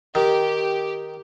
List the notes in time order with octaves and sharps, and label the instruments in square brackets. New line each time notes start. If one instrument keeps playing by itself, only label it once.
[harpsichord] D#3 [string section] G4